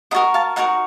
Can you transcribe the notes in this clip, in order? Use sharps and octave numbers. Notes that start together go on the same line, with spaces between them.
D#4 F#4 A#4 D#5 F#5
F5 A5
D#4 F#4 A#4 F#5 A#5